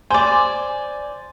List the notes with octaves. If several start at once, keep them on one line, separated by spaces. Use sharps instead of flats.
C5 D5 G#5